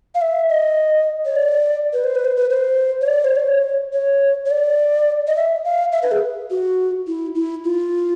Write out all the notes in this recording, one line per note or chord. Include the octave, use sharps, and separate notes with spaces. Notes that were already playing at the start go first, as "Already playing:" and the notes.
F5
E5
D#5
C#5
D5
B4
C5
B4
C5
B4
C5
C#5
D5
C5
C#5
C#5
C#5
D5
D#5
E5
F5
E5
B4
G#4
F#4
E4
E4
F4